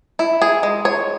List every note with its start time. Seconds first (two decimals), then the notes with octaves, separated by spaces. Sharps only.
0.19 E4
0.42 G#4
0.63 G#3
0.85 C#5